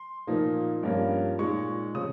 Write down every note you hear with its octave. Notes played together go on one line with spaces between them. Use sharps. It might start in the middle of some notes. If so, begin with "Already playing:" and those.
Already playing: C6
A#2 F3 A#3 D#4
G2 F3 A#3 C#4
A#2 G#3 D#4 C#6
C#3 F3 C4 D#6